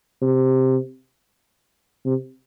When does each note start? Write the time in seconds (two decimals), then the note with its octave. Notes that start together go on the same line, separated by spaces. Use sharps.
0.22 C3
2.05 C3